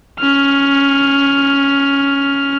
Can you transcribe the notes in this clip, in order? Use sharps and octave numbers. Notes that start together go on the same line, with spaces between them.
C#4 F6